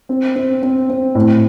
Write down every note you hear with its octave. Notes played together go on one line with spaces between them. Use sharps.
C4
C4
C4
C4
A2